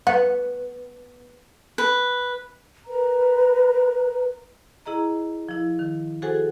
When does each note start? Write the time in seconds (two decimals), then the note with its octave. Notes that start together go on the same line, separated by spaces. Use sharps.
0.07 B3 F#5
1.78 B4
2.87 A#4 B4 A#5
4.86 E4 G#4 D#5 A#5
5.49 F3 E4
5.79 D#3
6.22 F#4 G#4 A4 C5 F#5 G#5